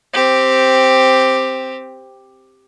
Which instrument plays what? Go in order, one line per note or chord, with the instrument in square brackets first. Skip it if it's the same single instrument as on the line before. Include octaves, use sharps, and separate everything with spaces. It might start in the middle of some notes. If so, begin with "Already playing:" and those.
[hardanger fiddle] C4 G4